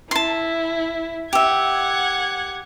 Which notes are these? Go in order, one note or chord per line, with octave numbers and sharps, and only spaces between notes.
E4 A5 C6
G4 E5 F#5 G#6